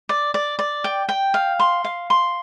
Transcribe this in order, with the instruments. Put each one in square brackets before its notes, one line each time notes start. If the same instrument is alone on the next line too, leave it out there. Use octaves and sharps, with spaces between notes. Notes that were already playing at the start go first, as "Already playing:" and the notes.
[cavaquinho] D5
D5
D5
G5
G5
F5
C6
F5
C6